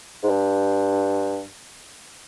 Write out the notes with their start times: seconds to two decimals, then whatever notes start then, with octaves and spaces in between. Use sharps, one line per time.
0.23 G#2
0.29 G2